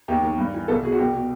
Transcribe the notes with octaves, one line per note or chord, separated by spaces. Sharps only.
D#2 G4
D#3
G2
E3
C2 A4
B2 G#4
F#4
C2 G4
B2